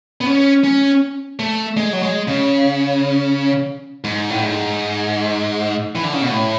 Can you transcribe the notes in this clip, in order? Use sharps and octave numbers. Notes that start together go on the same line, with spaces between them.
B3
C#4
C#4
A3
G#3
F#3
G#3
C#3
G#2
A2
G#2
E3
D3
C#3
B2
A2